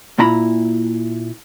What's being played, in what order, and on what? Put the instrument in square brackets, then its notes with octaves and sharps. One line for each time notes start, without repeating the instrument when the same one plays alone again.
[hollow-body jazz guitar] A#2 E4 A#5 B5